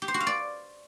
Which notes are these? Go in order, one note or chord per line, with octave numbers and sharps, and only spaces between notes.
G4
C5
F#4
F5
D5